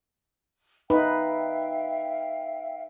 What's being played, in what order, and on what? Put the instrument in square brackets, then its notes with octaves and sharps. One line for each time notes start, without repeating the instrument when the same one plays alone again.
[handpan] D#4 B4 [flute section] E5 F5 G5